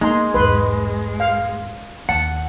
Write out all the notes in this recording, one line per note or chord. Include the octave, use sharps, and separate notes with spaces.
G#3 A#3 B3 D#4 A#5 C6
B1 E2 G#2 B4 C6
F5
D#2 F#5 A5